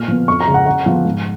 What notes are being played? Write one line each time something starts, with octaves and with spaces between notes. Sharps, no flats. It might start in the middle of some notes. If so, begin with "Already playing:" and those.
Already playing: A#2 F6
F3 B3
F2 C#6
A#5
C#3 G#3
F#5
C#3 F#5
F3 B3
G#2